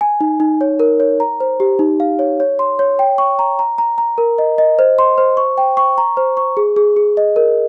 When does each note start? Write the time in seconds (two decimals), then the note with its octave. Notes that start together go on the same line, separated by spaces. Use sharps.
0.01 G#5
0.21 D#4
0.40 D#4
0.61 C#5
0.80 A#4
1.00 C#5
1.20 A#5
1.40 C5
1.60 G4
1.79 D#4
2.00 F5
2.19 C#5
2.40 C#5
2.59 C6
2.79 C#5
2.99 G5
3.18 C#6
3.39 A#5
3.59 A#5
3.78 A#5
3.98 A#5
4.18 A#4
4.38 D#5
4.58 D#5
4.79 C5
4.99 C6
5.18 C5
5.37 C#6
5.58 G5
5.77 C#6
5.98 A#5
6.17 C5
6.37 C#6
6.57 G#4
6.76 G#4
6.97 G#4
7.17 D#5
7.36 A#4